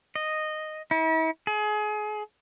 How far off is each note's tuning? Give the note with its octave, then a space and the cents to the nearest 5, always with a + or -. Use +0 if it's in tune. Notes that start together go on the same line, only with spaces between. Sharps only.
D#5 -5
E4 -45
G#4 +30